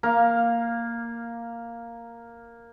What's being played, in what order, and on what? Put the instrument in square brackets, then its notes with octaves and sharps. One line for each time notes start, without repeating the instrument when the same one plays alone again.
[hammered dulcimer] A#3 F5